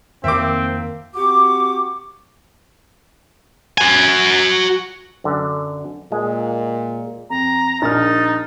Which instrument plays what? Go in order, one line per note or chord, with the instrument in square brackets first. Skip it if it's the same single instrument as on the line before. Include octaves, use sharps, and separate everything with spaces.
[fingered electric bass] F2 D#3 [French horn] A#3 [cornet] C4 [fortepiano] E5 D6
[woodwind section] C4 F#4 G4 C#6 D6
[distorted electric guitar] F#4 G#5
[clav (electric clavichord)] F#2 D3
[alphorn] A#2 [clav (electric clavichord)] G#3
[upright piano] F2 [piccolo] A#5
[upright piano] A#1 A#4 F6 [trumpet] D#4 [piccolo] A6